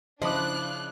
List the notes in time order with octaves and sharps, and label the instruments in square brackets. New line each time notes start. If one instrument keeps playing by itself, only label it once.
[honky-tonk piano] C#3 E4 D6 [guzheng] F3 B5 [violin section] D4 F#6 [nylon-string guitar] D#5